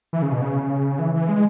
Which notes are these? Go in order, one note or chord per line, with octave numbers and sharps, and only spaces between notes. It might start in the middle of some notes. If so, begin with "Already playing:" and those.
E3
C#3
B2
C#3
E3
E3
G#3